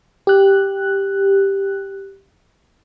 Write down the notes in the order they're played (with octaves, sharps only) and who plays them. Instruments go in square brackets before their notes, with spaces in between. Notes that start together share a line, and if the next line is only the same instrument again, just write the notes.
[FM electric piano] G4 F#6